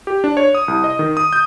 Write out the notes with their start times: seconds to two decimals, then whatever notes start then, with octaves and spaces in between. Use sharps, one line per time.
0.07 G4
0.24 D4
0.37 C#5
0.55 D#6
0.68 C2
0.84 D#5
0.99 D#3
1.17 D#6
1.33 G6